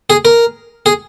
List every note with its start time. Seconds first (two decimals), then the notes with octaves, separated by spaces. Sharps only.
0.10 G#4
0.25 A#4
0.86 G#4